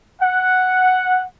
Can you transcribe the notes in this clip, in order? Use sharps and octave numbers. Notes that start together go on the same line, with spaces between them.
F#5